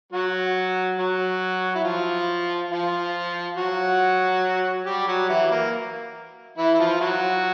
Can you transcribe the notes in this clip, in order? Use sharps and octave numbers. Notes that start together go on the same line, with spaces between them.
F#3 F#4
F#3 F#4
E4
F3 F4
F3 F4
F#3 F#4
G3 G4
F#3 F#4
E3 E4
A#3
E3 E4
E4
F3 F4
F#3 F#4